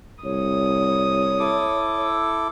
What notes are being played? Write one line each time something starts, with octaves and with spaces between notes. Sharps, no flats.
C2 C#5 D#6
E4 A4 D6